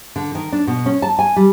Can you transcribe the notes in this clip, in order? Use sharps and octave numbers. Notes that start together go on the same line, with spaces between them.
D3
D#3
D4
B2
C#4
A5
G#5
G3